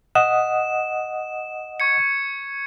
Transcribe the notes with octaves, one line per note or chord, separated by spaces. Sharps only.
D#5 F#5 D#6 E7
C#6 G#6 C#7